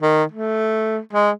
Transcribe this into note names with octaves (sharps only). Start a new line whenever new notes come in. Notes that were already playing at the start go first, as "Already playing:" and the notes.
D#3
A3
G#3